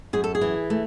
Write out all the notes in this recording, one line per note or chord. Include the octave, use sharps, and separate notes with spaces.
F#2 G#4
A4
G#4
E3
A3